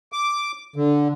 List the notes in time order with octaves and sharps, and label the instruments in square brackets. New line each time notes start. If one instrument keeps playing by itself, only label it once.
[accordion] D6
D3